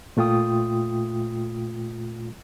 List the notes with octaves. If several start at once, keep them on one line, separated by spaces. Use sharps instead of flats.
A#2 A3 F4 G5 D#6